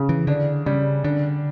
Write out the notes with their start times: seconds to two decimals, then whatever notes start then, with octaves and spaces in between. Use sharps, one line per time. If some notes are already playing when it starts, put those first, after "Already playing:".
Already playing: C#3
0.09 E3
0.27 D3 D4
0.66 C#3 G3
1.04 D3 D4